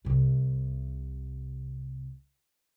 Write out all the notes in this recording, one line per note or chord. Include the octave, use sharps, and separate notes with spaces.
C2 C3